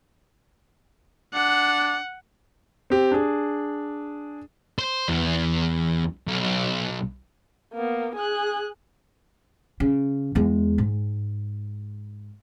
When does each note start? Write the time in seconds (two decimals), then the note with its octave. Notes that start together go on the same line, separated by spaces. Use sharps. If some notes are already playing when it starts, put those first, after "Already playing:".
1.34 D4 F#5
2.90 C4 G4
3.11 D4 G#4
4.79 C5
5.09 E2
6.27 B1
7.73 A#3 B3
8.15 G#4 F#6
9.80 C#3
10.35 E2 G#3
10.78 G#2